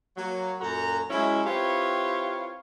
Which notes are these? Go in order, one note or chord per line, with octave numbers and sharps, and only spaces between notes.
F#3 A#3
F#2 A#2 F#4 A4 A#5
F#3 G#3 C#4 E4
C4 E4 F4 G4 B4 C#5